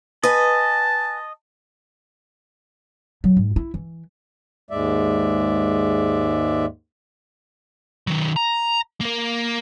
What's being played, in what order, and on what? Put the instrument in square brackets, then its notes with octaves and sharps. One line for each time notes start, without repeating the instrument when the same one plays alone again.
[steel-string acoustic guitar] B4 G#5 [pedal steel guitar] D#5 [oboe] A5
[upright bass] F#3
G#2
E4
E3
[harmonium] D#2 G#2 G#3 D5 E5
[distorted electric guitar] D#3 F#3
A#5
A#3 A#4